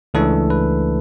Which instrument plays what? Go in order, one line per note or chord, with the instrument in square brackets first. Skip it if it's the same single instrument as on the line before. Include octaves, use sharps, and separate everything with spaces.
[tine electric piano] C#2 C#3 E3 A3 D4 A4
B4